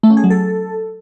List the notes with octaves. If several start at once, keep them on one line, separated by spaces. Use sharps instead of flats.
A3
C#4
G#4
F#3
A4